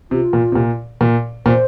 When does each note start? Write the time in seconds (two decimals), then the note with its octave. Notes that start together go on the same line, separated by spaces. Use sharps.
0.11 C3 F4
0.33 A#2
0.52 C3
0.55 A#2
1.01 A#2
1.46 A#2 C5